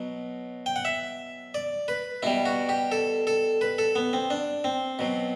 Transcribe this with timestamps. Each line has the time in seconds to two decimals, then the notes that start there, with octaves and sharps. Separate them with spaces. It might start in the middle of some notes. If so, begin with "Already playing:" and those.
Already playing: B2 F#3
0.66 G5
0.76 F#5
0.85 E5
1.54 D5
1.88 B4
2.23 B2 G3 E4
2.46 F#4
2.69 G4
2.92 A4
3.27 A4
3.61 B4
3.78 A4
3.96 B3
4.13 C4
4.30 D4
4.64 C4
4.99 B2 F#3